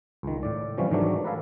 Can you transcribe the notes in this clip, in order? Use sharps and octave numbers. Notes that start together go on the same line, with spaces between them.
C#2 D#3
A2 D5
C3 E3 F3 G3 C#4
G#2 D#3 E3 F#3 A3 D4
A#4 B4 D5 E5 F5 G#5